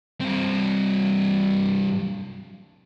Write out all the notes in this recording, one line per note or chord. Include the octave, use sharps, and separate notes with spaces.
G2 C4